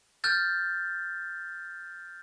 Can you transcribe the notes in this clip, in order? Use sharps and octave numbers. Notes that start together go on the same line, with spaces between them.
F6 G6 A6